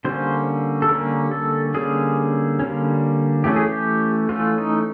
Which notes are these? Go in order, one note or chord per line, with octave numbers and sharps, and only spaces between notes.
D3 G3 A#3 C#4 C5
A4
D3 G3 A#3 C#4 A#4
A4
D3 G3 A#3 C#4 G#4
D3 G3 A#3 C#4
E3 A3 C#4 G4
G#4
G4
E3 A3 C#4 F4
D#4